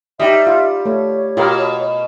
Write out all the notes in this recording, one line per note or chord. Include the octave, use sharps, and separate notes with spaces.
G3 D#4 G4 D#5 E5
F4
A3 C#5
B2 F4 G4 A#4